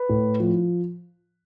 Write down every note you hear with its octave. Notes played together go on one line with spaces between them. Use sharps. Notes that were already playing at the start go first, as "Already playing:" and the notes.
Already playing: B4
A2
F3